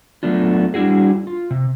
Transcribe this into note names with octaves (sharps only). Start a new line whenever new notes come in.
F#3 A3 B3 D4 F4
G3 D4 E4 F#4 G#4
F4
C3